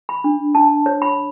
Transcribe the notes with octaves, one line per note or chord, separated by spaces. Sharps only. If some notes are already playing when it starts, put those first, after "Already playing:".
B5
D4
D4 A5
C#5
B5